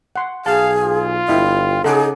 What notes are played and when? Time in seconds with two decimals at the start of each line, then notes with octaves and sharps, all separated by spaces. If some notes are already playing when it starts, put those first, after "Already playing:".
0.16 F#5 C6
0.46 B1 G#4 F5 A5
0.82 F4
1.28 G1 E4 D#5 G5
1.84 C#3 D#4 G#4 A4 F#5 D6